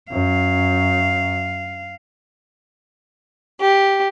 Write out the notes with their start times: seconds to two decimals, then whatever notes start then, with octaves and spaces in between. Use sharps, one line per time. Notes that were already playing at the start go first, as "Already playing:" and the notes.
0.12 F#2 F5
3.60 G4